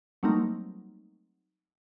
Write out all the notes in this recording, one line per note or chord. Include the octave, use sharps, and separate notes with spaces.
F#3 G3 A3 A#3 C4 D#4